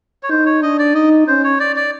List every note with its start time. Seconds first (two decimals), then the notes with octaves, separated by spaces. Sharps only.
0.23 C#5
0.30 D#4 C5
0.46 C#5
0.62 D4 D#5
0.79 D5
0.95 D#4 D#5
1.27 C#4 C5
1.44 C#5
1.60 D5
1.76 D5